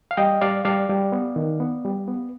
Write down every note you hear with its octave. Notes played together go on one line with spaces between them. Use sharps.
F5
G3 D#5 G5
G3 D5 F5
G3 D5 F5
G3
B3
D#3
B3
G3
B3